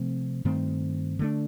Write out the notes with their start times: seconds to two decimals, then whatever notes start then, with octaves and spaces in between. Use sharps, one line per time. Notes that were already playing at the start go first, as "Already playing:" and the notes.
Already playing: C3 F3 A3 C4
0.45 G2 D#3 A3 C4
1.19 D3 A3 D4